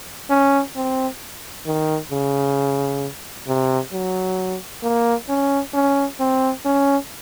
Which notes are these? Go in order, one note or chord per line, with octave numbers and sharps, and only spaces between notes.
C#4
C4
D#3
C#3
C3
F#3
A#3
C#4
C#4
C4
C#4